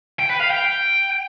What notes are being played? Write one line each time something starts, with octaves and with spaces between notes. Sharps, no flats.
G5
B4
F5
G5